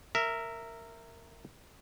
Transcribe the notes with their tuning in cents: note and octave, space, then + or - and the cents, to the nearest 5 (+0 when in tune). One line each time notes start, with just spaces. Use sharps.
A#4 -15 E5 +0